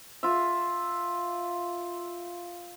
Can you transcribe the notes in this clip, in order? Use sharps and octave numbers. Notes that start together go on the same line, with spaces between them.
F4 E5